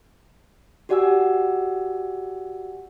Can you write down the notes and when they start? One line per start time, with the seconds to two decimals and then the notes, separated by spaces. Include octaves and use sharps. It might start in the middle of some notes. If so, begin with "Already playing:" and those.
0.89 F#4 G4 D5 F#5 G#5 E6